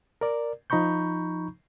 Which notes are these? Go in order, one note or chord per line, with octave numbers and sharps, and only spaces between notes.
A#4 D5
F3 D#4 A#5 B5 C#6 G6